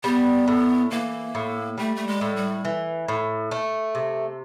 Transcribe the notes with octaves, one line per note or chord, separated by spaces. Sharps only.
G3 B3
A2
E3 A#3
A2
G3 A3
A3
G#3
A2
G3
E3
A2
A3
C3